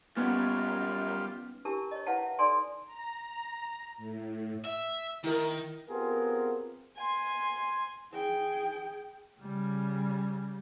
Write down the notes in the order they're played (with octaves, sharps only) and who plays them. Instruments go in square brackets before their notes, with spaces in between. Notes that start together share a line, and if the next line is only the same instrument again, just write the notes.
[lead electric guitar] F#2 [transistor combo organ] G3 F4 [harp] B3 C#4 D#4
[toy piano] D4 E4 G4 A#4 A5
C#5 D#5
E4 B4 C#5 F5 F#5 A5
E5
D#4 A4 D5 G#5 C6
[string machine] A#5
A2
[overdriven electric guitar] E5
[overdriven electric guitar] D#3 [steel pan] E4 A#4
[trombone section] B3 C4 F4 G4 G#4 A#4
[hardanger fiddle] G#5 C6
[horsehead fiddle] G#4 G5
[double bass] C#3 G3